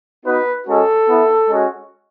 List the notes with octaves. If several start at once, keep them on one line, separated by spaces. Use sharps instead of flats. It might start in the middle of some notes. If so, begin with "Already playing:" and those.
B3 D#4 F#4 B4
G#3 C#4 F#4 A4
B3 E4
G#3 C#4 F#4